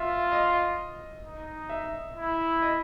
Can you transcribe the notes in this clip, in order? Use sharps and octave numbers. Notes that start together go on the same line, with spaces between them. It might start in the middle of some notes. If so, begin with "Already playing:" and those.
Already playing: F4 E5
D#5
D#4
E5
E4
D#5